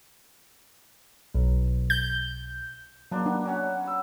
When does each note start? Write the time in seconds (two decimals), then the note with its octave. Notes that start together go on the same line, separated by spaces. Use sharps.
1.34 B1
1.90 G6
3.12 F#3 A#3 D4 C6
3.26 B3 D4
3.45 F#3 C#4 F#5
3.83 B5 E6